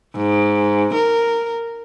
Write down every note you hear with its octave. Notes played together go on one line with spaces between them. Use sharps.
G#2
A#4